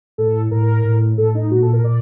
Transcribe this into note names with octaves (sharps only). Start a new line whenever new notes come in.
A2 A4
A2 A#4
A2
A2 A4
D#4
A#2 F#4
A4
A#4
A#2 D5